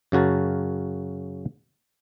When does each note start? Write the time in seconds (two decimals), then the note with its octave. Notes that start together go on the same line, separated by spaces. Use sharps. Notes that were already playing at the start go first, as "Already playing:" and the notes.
0.12 F#2 C#3 F#4 A#4 A5